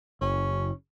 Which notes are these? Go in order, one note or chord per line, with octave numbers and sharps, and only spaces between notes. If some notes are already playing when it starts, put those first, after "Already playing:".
F#1 C#4